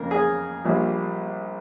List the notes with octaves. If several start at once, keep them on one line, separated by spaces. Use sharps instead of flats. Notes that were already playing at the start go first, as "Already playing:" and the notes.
Already playing: F2 C#3 A#3 A#4
G#4
A#1 A#2 G3 A#3